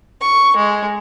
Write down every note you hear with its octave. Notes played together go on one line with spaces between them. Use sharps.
C#6
G#3